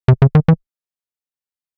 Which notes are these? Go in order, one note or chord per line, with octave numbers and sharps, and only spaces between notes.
C3
C#3
D#3
E3